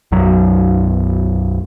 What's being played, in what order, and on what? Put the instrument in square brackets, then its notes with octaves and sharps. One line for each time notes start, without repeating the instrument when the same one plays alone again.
[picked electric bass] B1 F#2 F#3